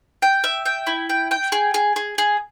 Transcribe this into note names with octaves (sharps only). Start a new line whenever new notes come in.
G5
E5
G5
E4
G5
G5
G#4
G#4
G#4
G#4